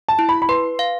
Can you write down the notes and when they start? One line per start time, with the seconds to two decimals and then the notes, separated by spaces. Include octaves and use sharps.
0.09 A5
0.19 E4
0.29 B5
0.42 B5
0.49 B4 C6
0.79 F5